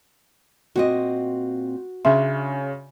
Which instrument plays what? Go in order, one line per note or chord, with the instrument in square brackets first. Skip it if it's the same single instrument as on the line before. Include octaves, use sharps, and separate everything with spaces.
[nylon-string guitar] A#2 C4 D#5 [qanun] F#4
[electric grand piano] C#3 C#4 C6 [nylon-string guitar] D4 [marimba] E5